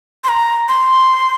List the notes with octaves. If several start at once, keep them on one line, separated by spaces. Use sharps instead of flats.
C6
A#5
C6